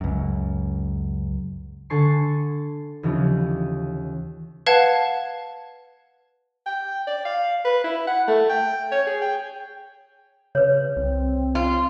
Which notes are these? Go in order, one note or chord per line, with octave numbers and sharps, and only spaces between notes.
C#2 F#2
D3 A4 G#5 A5 C#6 C7
D#2 C#3 E3 F3
B4 F5 F#5 A5 G#6
G5
D5
F5
B4
E4
F#5
A3
G5
C#5
G#4
G5
C#3 B4 C#5
C2 C4
F4